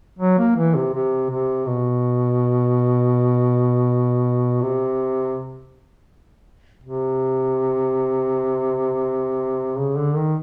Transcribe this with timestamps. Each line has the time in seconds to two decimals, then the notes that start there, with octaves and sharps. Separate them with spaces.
0.19 F#3
0.38 A#3
0.57 E3
0.75 C3
0.94 C3
1.30 C3
1.67 B2
4.62 C3
6.84 C3
9.78 C#3
9.98 D3
10.16 D#3